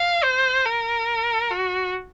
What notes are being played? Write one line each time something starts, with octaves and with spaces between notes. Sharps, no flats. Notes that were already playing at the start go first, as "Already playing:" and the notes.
Already playing: F5
C5
A#4
F#4